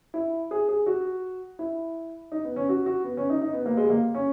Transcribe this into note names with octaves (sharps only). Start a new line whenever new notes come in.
E4
G#4
G#4
F#4
E4
D#4
B3
C#4
F#4
F#4
B3
C#4
D#4
D#4
B3
A#3
G#3
A#3
C#4